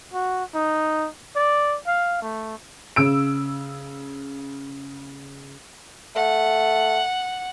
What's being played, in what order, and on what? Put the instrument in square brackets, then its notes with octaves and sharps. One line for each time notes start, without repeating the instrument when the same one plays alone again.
[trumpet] F#4
D#4
D5
F5
A3
[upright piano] C#3 E6 D7
[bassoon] A3 [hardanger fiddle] F#5